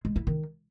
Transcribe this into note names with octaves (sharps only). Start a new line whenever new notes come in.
G#3
E4
D#3